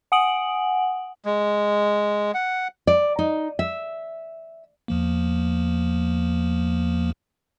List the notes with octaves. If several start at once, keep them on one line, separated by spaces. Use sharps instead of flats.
F#5 G#5 D#6 D7 F#7
G#3
F#5
D5
D#4
E5
E2 F3 A#3